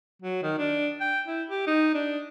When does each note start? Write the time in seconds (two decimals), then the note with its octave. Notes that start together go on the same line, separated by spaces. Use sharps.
0.22 F#3
0.43 D#3
0.59 D4
1.01 G5
1.28 E4
1.49 G4
1.67 D#4
1.95 D4